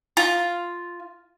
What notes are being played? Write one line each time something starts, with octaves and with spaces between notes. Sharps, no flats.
F4